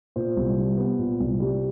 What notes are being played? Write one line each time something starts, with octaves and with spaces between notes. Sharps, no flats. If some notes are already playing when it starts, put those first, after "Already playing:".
A#2 C5
C2
G3
B3
A#2
C2
G3